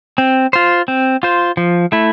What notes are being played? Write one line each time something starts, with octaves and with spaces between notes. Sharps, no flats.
C4
F4 C5
C4
F4 C5
F3
A3 E4